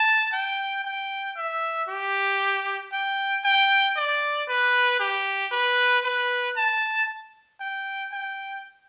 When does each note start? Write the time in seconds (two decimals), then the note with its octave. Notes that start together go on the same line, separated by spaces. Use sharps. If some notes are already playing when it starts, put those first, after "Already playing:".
Already playing: A5
0.33 G5
0.85 G5
1.37 E5
1.88 G4
2.93 G5
3.45 G5
3.97 D5
4.49 B4
5.00 G4
5.52 B4
6.04 B4
6.57 A5
7.60 G5
8.12 G5